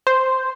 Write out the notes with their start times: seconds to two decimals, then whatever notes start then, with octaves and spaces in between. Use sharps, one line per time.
0.07 C5